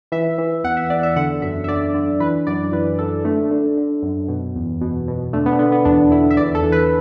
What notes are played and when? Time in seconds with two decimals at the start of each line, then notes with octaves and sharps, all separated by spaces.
0.12 E3 E5
0.38 E3
0.64 E2 F#5
0.77 E5
0.90 E2 D5
1.03 E5
1.16 D3 F#5
1.42 F#2 E5
1.64 E5
1.68 D3 D5
1.94 D3
2.20 E3 B4
2.47 F#2 D5
2.72 E3 B4
2.99 F#2 A4
3.24 D3 A3
3.51 D3
3.77 D3
4.03 F#2
4.28 B2
4.56 E2
4.81 B2
5.08 B2
5.33 D3 A3
5.46 B3
5.52 D4
5.59 D3 B3
5.72 B3
5.85 E2 D4
6.11 D3 E4
6.31 E5
6.37 E2 D5
6.55 A4
6.63 E3
6.72 B4